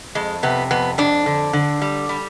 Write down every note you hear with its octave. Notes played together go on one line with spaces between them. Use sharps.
F2 G#3
C3 B3
F2 B3
F2 D4
D3
D3
G3
G3